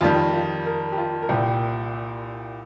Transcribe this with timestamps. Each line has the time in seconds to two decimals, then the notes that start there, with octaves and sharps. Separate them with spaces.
0.01 F2 D#3 G3 F4
0.33 F4
0.66 A#4
0.92 G4
0.98 F4
1.22 A#4
1.29 C2 A#2 G3 G4